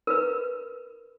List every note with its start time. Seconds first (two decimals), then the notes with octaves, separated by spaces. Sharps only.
0.07 A#4 B4